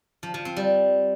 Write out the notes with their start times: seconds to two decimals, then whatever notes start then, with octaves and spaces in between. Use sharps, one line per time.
0.23 F3
0.34 F3
0.45 C4
0.56 G3